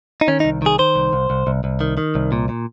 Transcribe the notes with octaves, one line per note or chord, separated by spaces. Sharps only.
D#4
D#3 C#4
D#4
C2
D#3 G#4
D#3 C5
C2
C2
C2
C2
C2
D#3
D#3
C2
A#2
A#2